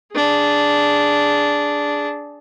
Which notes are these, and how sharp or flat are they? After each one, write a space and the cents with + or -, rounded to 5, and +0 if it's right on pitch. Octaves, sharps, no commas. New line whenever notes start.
D4 -10 G#4 +0